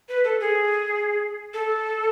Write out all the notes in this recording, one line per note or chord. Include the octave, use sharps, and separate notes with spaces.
B4
A4
G#4
A4